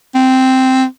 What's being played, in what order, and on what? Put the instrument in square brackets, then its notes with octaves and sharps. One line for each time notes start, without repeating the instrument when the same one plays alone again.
[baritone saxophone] C4